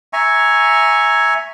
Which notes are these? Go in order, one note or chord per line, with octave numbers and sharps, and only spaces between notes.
E5 G#5 A#5 C#6